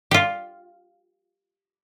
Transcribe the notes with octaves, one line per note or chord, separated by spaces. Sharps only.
F4 G4